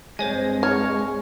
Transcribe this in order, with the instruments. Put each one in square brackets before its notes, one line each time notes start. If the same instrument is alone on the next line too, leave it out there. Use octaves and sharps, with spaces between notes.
[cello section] G2 C4 [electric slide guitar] G#3 [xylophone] C5 C#5 G#5
[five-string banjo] C#5 [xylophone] F6